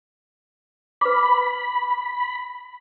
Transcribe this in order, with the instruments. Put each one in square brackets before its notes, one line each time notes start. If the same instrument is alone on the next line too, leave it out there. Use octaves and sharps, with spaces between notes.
[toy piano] B4 D6 [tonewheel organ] B5